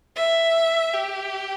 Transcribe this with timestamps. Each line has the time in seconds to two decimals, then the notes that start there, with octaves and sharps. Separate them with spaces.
0.16 E5
0.94 G4